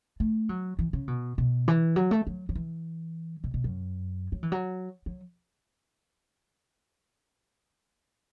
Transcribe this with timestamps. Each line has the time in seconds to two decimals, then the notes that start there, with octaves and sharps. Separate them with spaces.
0.20 A3
0.49 F#3
0.79 E3
0.93 C#3
1.08 B2
1.38 B2
1.68 E3
1.96 F#3
2.11 A3
2.27 F#3
2.49 F#3
2.55 E3
3.44 B2
3.54 B2
3.64 F#2
4.32 F#3
4.43 E3
4.52 F#3
5.06 F#3